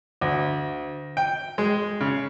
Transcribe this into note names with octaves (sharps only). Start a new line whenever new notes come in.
D2
G5
G#3
C#3